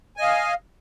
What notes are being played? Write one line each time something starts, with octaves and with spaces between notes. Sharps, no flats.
D#5 F5 G#5